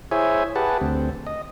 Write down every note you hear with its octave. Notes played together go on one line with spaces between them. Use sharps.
E4 G#4 C5 C#5 E5 G#5
G4 G#4 B4 F#5 A5
D2 C4
D#5